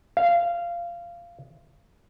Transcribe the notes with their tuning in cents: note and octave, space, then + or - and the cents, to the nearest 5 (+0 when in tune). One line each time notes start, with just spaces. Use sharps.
F5 -15